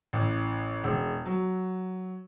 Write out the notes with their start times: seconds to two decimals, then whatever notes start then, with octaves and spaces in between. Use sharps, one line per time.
0.13 A1
0.84 E1
1.26 F#3